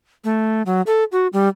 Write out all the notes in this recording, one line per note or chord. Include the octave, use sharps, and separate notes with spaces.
A3
F#3
A4
F#4
G3